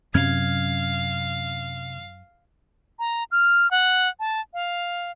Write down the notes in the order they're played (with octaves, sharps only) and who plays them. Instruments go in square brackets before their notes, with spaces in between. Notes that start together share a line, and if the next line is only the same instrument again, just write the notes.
[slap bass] F#2 F#3 C#4 [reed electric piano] C3 F6 G#6 [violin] F5
[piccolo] A#5
F6
F#5
A5
F5